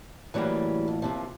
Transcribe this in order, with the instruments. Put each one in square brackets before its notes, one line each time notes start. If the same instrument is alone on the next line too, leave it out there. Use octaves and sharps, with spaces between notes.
[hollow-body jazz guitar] E2 A2 A#3 [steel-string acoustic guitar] E3 F#3 G3
[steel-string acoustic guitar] F2
D#2 C3 F3